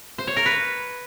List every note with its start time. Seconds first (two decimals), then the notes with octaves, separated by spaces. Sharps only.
0.18 C5
0.27 C#5
0.36 A#4
0.45 B4